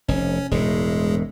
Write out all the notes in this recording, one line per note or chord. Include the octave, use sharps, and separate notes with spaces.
F1 C#4
E1 A2 G#3